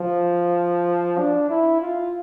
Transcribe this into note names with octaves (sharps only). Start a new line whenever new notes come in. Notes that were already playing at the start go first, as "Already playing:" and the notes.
Already playing: F3
D4
E4
F4